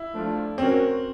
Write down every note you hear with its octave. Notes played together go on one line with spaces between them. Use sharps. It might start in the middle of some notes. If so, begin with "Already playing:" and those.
Already playing: E4
F3 A3 D4
C4 C#4 F#4 A#4 C#5